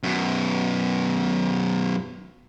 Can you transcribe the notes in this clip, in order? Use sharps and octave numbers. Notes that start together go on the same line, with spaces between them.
F#2 B2